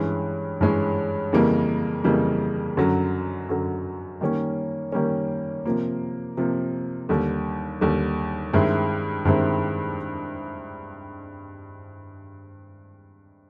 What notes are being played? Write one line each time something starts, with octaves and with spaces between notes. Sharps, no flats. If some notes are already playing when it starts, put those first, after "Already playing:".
Already playing: G2 E3 G#3 C#4
G2 E3 G#3 C#4
F2 C#3 E3 G3 A#3
F2 C#3 E3 G3 A#3
F#2 D3 F#3
F#2 D3 F#3
D#3 G3 A#3 C#4
D#3 G3 A#3 C#4
C3 F3 A#3
C3 F3 A#3
D#2 D3 G3
D#2 D3 G3
G2 D#3 G#3 C4 E4
G2 D#3 G#3 C4 E4